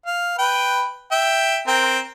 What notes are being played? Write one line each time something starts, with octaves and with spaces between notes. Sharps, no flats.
F5
B4 G5
E5 G5
C4 A#4 G5